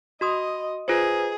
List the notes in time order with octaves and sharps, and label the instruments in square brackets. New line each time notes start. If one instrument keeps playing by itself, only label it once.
[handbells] F#4 C6 D#6 [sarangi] D#5
[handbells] F4 B4 C5 [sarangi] G#4